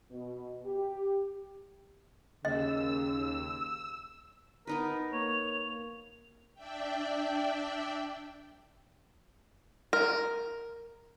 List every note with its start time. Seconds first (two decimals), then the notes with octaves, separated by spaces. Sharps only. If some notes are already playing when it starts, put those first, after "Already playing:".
0.10 B2
0.65 G4
2.45 D#2 C#3 D#5 E6
4.67 B3 D#4 A#4 B4
5.13 A#3 C#5 F7
6.54 D4 D5 E5 G5
9.93 A#4